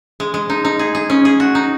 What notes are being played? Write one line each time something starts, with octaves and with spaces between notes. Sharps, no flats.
G#3
G#3
D#4
D#4
G#4
G#4
C#4
G#4
F#4
D#4